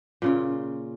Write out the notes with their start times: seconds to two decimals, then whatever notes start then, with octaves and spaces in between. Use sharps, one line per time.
0.22 A#2 C#3 F4